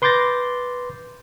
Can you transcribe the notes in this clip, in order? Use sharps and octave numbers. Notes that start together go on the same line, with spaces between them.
B4 C6 D6 G6 A6 A#6